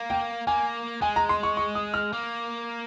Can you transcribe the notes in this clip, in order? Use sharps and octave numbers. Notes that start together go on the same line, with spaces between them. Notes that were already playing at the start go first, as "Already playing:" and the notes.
Already playing: A#3
G5
A#3 G#5
G#3 G#5
A#5
C6
C#6
C#6
D#6
F6
A#3